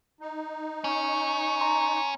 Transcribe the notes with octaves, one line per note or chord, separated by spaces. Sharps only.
D#4
C#4 C#6
A#5 C6